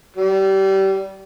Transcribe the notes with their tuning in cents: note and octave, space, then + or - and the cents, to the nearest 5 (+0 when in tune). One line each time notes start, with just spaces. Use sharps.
G3 -25